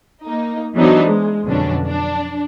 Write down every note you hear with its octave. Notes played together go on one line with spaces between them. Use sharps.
A#3 D#4
E3 F#3 B3 D4 D#4 C5
G#3
F2 B2 D3 F#3 C#4 D4
D4